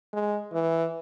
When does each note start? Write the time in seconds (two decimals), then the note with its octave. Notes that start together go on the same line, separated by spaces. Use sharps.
0.13 G#3
0.52 E3